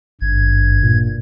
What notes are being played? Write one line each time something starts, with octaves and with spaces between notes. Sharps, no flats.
G#1 G2 G#6
A#2